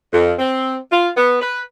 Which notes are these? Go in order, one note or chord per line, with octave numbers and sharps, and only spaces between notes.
F2
C4
F4
B3
B4